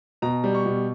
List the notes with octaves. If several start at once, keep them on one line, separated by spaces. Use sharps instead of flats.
B2 A#5
G3
C#6
B2